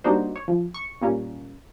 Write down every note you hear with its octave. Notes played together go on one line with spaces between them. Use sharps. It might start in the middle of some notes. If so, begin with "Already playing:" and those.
G3 A#3 D4 D#4 F#4 C5
C#5
F3
C#6
A#2 G3 A#3 C#4